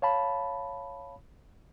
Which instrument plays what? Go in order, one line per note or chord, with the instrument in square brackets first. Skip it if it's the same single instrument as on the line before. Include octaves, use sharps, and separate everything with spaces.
[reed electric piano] C#5 F5 A5 B5